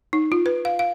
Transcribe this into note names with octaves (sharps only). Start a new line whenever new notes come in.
D#4
F4
B4
F5
F5